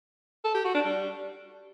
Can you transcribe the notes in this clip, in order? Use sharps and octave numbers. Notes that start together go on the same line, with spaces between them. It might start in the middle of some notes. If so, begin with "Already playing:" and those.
A4
G4
F#4
D4
G3